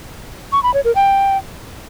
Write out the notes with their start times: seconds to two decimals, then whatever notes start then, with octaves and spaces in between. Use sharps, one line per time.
0.52 C#6
0.63 B5
0.74 C#5
0.85 A#4
0.95 G5